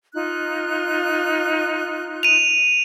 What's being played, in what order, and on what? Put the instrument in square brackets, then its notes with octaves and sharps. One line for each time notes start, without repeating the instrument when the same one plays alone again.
[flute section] D#4 F4 F#6
[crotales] D#7 F7